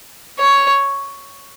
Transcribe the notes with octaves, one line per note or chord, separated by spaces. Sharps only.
C#5